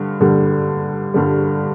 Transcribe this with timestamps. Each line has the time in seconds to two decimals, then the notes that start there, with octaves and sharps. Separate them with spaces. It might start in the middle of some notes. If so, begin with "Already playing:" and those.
Already playing: G2 D3
0.20 G2 D3 G3
1.14 G2 D3 G3